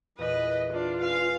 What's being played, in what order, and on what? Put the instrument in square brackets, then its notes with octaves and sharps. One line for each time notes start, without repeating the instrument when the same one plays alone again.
[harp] E2 A#2 [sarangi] B4 [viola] D#5
[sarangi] D4 [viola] F4
[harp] C#4 B4 [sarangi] F5